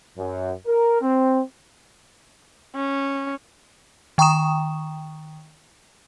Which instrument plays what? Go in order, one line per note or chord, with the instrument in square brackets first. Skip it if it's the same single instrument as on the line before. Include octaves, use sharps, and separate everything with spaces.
[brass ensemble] F#2
A#4
C4
[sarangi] C#4
[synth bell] D#3 G5 A#5 C#6 D#6 E7